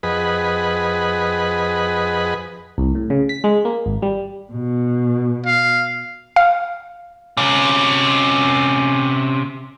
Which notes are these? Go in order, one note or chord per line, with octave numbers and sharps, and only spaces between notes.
F2 G#4 B4 D#5 F#5 B5
C2
A2
C#3
B6
G#3
A#3
G#1
G3
B2
F5
F5
C3 C#4